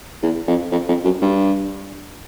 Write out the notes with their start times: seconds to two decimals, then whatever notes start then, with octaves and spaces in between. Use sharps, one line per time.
0.23 E2
0.47 F2
0.72 F2
0.89 F2
1.05 F#2
1.22 G2